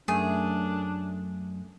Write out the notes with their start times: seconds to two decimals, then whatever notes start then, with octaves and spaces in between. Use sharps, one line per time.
0.08 F#2 A3 D4 G#4